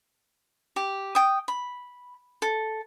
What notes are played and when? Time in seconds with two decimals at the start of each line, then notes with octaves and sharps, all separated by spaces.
0.76 G4
1.15 G5 D#6
1.48 B5
2.42 A4